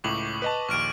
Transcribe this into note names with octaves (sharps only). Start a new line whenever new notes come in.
C#2 A2 C#6 D6 F#7
B4 D#5 A5
A#1 D#2 C#6 F6 D7